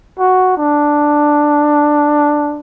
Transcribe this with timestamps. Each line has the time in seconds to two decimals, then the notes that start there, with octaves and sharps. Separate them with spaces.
0.19 F#4
0.57 D4